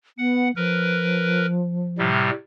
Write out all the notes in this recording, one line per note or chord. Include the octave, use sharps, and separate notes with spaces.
B3 F#5
F3 A#4 B4
A2 C3 G3